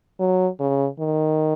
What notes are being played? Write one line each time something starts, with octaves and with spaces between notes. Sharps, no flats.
F#3
C#3
D#3